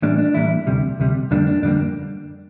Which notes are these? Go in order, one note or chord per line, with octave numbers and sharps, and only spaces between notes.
A2 E3 G3 A#3 D4
D4
A2 E3 G3 A#3 E4
D2 C3 G3
D2 C3 G3
F2 D3 G3 A#3 D4
D4
F2 D3 G3 A#3 D4